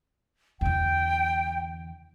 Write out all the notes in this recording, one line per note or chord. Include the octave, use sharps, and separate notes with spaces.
E2 D3 G5